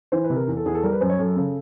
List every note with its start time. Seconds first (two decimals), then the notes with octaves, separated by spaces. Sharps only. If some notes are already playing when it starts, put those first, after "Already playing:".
0.12 E3 C5
0.24 B4
0.30 C3
0.36 A#4
0.48 E2
0.57 A4
0.66 E2 G#4
0.75 A4
0.83 G3 A#4
0.92 B4
1.01 F#2 C5
1.09 C#5
1.19 F#2 A4
1.36 C#3